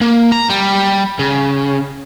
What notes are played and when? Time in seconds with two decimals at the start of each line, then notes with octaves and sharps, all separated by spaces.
0.01 A#3
0.32 A#5
0.50 G3
1.19 C#3